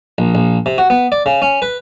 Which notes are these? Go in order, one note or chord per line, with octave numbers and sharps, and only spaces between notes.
A#1
A#1
C3
F#4
B3
D5
C#3
C#4
B4